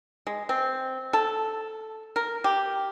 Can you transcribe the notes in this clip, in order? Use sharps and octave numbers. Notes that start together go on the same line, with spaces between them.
G#3
C4
A4
A#4
G4